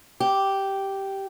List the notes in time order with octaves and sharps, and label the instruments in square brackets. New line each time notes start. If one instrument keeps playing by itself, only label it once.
[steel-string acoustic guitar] G4